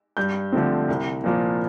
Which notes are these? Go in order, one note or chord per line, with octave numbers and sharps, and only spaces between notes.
G2 G6
D3 F3 A3 C4
C2
A#2 F3 A#3